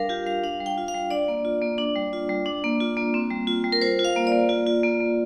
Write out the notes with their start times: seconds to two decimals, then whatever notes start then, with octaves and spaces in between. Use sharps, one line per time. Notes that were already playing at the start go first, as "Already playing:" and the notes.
Already playing: G3 D4 A#4 F5
0.09 F4 G4
0.26 G3 F5
0.43 D4 F5
0.60 G3
0.66 G5
0.78 F4
0.88 F5
0.95 G3
1.11 D4 D5
1.28 A#3
1.45 F4
1.62 A#3
1.78 D4
1.96 G3
2.13 F4
2.29 G3
2.46 D4
2.64 A#3
2.80 F4
2.97 A#3
3.14 C4
3.31 G3
3.47 F4
3.64 G3
3.72 A#4
3.82 F4 C5
3.99 F4
4.05 F5
4.16 A#3
4.27 D5
4.32 A#3
4.49 F4
4.67 F4
4.84 A#3
5.01 A#3